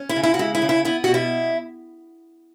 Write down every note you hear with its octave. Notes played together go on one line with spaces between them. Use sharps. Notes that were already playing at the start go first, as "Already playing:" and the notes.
Already playing: C#4
E4
C#3
E4
F#4
G#3 E4
E4
C#3
E4
B3 E4
B2 F#4
E4